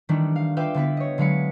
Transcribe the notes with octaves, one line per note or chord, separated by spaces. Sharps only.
D#3 E3 G3 A3 D4 E4
F5
F4 B4 E5 F5 G5 D6
D3 B3 E4 B4
C#5 D#5
D3 F#3 G#3 F5 B5 C#7